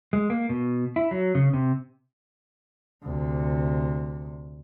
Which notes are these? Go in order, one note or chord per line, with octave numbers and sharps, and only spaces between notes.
G#3
A#3
B2
E4
F#3
C#3
C3
D2 C3